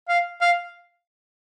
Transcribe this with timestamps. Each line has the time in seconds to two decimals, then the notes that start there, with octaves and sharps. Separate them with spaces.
0.09 F5
0.41 F5